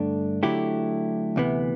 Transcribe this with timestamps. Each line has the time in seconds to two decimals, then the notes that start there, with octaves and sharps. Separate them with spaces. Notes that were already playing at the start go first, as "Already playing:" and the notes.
Already playing: G2 D3 A3 D4
0.43 D3 F#3 A3 E4 G4
1.36 D2 C3 E3 B3